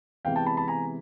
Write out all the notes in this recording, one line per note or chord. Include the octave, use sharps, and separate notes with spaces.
C3 E3 G#3 B3 F5 G5
G5 A5
A5 B5
A5 B5
G#5 A#5